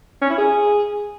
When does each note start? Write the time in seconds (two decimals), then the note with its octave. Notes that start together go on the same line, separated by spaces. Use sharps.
0.22 C#4
0.30 E4
0.38 G#4